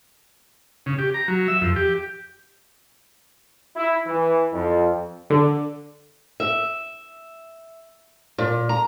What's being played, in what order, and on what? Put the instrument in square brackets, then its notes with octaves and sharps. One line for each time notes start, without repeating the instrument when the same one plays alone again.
[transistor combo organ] C#3
G4
A#5
F#3
E5
F2
G4
[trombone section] E4
E3
F2
[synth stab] D3
[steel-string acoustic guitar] E5
A#2
A#5